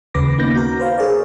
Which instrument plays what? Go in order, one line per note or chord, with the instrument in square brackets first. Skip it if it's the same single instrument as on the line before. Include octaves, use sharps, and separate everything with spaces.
[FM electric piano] D#2 C#3 C#4 B4 D6 A#6
A#3 B3 C#4 D#4 G6 A#6
F#4 A#4
B4 C5 F5
G#4 A#4 C#5 D5